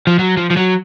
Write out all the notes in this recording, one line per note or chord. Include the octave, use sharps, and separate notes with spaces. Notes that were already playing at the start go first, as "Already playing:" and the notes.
F3
F#3
F3
F3
F#3